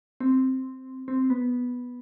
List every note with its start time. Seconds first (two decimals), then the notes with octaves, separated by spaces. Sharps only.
0.20 C4
1.08 C4
1.30 B3